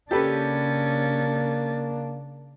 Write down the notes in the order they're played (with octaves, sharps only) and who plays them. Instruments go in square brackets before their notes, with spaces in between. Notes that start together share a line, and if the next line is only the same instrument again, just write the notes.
[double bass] C#3 D4 [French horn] A#3 [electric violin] C#4 A6 [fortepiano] G4 A4 B4